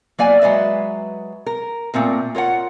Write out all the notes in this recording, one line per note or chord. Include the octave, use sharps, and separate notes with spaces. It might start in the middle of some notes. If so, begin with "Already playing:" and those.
F#3 A#3 D5 G#5
F#3 G#3 B4 E5
A#4
A#2 A3 C4 A#4
F4 A#4 C#5 F#5